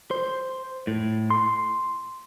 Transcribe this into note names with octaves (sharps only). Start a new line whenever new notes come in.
C5
A2
C6